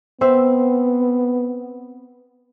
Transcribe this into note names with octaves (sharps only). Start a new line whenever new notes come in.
B3 C4 C5 E5